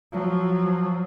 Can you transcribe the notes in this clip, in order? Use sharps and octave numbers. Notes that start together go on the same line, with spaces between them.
F3 F#3